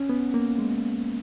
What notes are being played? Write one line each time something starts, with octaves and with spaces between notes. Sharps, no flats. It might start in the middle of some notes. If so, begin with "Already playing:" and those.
Already playing: C#4
B3
A#3
G#3